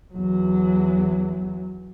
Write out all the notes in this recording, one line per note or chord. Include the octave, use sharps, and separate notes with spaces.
E2 F#3